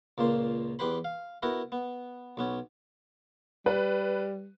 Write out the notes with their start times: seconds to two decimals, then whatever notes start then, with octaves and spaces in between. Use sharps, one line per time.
0.18 C#2 A#2 A#3 C5
0.79 E2 G4 B4 C5 B5
1.04 F5
1.42 B3 E4 F#4 A#4
1.72 B3
2.37 B1 B3 C#4
3.66 G3 B4